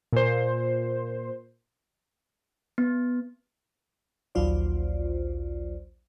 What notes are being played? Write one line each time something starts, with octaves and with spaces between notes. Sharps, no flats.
A#2 C5
B3
A#1 D#2 F#3 F4 C5 D5